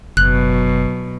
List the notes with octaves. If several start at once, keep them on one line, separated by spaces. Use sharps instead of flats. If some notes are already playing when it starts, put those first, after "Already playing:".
F#1 B2 F#3 F#6